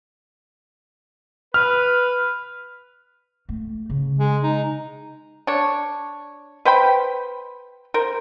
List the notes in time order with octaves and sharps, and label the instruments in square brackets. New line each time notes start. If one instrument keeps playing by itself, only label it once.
[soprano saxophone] B4 [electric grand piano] F6
[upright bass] A3
C#3
[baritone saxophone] G#3
D#4
[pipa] D4 C#5
B4 C5 G5 B5
A#4 C5